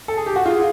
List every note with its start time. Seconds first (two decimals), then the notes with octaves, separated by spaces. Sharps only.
0.08 A4
0.17 G#4
0.26 G4
0.36 F#4
0.45 F4 G#4